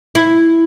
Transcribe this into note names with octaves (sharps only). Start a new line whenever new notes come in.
E4